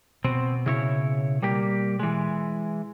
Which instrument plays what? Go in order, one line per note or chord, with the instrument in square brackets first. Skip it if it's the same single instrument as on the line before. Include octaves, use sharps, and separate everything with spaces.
[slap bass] B2 [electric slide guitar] C4
[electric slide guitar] C#3 E4 C#5
G3 A#3 G4
E3 G#3